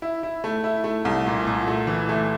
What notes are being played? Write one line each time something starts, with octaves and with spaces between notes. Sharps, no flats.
E4
E4
A3
E4
A3
C2
A#2
A#2
A3
E3
A3